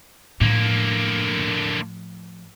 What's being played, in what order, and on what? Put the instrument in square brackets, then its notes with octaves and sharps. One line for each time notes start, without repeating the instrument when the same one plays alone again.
[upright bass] A2 F3 [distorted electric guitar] D3 A#3